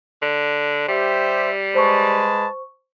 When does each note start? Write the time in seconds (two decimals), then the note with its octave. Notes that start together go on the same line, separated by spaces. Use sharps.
0.22 D3
0.88 G3 G4 C5 E5
1.75 G#3 B4 C5 A5 C#6